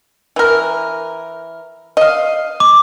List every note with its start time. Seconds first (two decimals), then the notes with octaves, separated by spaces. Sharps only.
0.36 E3 A#4
1.97 D#5 F5
2.60 D6